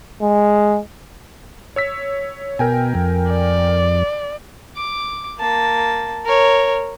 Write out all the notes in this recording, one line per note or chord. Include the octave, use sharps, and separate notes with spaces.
G#3
C#5 E6 B6
B2 A#4 G5 G#5
F2
D5
D6
A#3 A5
A#4 C#5